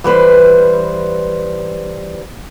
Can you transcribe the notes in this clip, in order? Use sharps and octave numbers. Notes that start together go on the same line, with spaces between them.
E3 G3 B4 C5